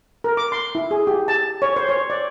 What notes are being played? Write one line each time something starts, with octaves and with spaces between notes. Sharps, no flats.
A#4
D6
C6
E4
G#4
G4
A5
C#5
C5
C#5
D5